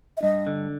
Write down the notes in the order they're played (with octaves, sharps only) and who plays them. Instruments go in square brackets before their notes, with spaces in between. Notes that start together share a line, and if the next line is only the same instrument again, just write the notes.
[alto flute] E5
[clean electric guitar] G2 [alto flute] D#5
[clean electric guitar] D3